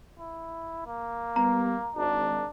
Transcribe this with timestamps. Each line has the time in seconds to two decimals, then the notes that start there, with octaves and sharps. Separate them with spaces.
0.19 E4
0.87 A#3
1.36 G3 B3 A#5
1.96 G#1 D4